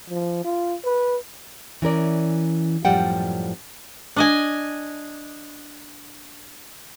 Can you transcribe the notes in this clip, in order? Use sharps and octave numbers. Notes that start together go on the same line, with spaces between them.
F3
F4
B4
E3 C#4 A#4 D5
F#2 A2 F3 G3 F#5 G5
D4 D#5 G#5